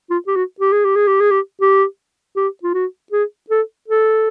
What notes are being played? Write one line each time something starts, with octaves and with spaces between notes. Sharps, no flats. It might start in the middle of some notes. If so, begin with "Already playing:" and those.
F4
G4
F#4
G4
G#4
G4
G#4
G4
G#4
G4
G4
G4
F4
F#4
G#4
A4
A4